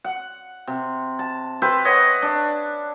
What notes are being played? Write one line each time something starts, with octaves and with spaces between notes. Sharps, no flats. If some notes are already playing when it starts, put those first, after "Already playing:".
F#5
C3
A5
G4 B4 C5 E5
B4 C#5 D#5 F#5
D4